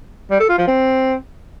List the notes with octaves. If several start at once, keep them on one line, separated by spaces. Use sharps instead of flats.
G3
A4
F4
F3
C4